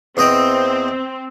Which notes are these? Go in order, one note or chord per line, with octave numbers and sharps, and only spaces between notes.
E2 C4 D#5 G5